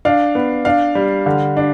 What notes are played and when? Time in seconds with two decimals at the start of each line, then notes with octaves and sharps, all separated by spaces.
0.05 D4 F5
0.35 B3
0.65 D4 F5
0.95 G3
1.26 D3
1.57 D4